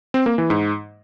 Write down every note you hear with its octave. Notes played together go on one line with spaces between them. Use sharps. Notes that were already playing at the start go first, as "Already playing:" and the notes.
C4
A#3
E3
G#2